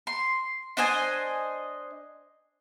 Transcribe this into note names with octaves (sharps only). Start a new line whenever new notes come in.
C6
D4 C5 D#5 G#5